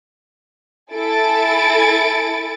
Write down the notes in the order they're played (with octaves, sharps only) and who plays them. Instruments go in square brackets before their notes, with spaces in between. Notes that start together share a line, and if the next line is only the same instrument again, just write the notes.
[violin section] E4 A4 G#5 A6 D7